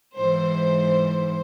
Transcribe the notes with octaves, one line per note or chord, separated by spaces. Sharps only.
G#2 E3 C5